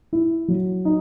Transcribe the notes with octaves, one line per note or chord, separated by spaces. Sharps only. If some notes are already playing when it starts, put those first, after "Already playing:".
E4
F#3
D#4